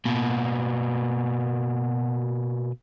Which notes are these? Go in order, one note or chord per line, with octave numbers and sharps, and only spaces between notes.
B2 A#3